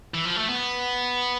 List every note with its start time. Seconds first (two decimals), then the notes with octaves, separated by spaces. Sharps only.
0.14 E3
0.25 F3
0.36 A3
0.48 B3